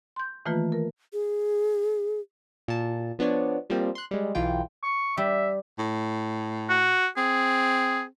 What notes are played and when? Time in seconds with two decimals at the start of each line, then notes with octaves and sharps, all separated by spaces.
0.16 C6 G6
0.46 D#3 E3 A3 A#3 F4 B4
0.72 A#4
1.13 G#4
2.68 A#2 A5
3.19 F3 B3 D4 C#5 D5
3.70 F3 G3 A#3 C4
3.95 C6 F#6
4.11 G3 G#3
4.35 B1 E3 F4 G5
4.82 C#6
5.17 G3 E5
5.79 A2
6.69 F#4
7.17 C4 G#4